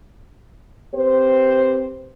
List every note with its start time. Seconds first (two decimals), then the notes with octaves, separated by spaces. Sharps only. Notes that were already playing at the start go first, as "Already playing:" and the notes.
0.95 C4 G4 B4 C5